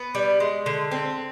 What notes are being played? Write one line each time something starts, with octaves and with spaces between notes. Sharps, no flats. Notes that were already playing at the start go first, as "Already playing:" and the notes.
Already playing: B3
G3
G#3
D3
C4